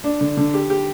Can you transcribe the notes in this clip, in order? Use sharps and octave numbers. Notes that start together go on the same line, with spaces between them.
D4
D3
D3
G4
G4